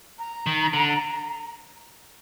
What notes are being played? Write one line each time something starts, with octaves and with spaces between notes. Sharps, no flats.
A#5
D#3
D3